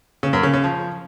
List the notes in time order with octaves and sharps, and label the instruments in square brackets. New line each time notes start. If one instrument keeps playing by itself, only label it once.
[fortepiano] C#3
F#2
C#3
C#3
F3